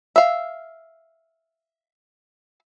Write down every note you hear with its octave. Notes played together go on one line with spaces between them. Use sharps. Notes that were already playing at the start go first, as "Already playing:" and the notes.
E5 F5